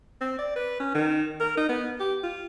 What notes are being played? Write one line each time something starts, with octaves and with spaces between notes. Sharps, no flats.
C4
D5
B4
C#4
D#3
A#4
D#4
B3
G4
F4